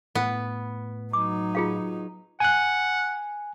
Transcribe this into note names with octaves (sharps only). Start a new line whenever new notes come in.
A2 B3
F#3 D#4 D6
F4 G#4 F5
F#5 G#5 F#6